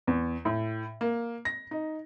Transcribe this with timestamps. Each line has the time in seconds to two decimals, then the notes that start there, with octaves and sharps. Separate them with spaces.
0.07 E2
0.45 A2
1.01 A#3
1.45 A#6
1.71 D#4